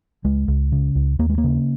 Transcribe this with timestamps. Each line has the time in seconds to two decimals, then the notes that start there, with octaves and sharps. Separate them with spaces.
0.24 C#2 G#3
0.48 C#2
0.72 C#3
0.95 C#2
1.19 D#2 A#3
1.29 G#3
1.38 A#3
1.44 C#3